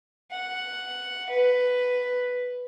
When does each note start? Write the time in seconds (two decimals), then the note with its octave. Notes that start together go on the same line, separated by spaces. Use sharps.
0.31 F#5
1.29 B4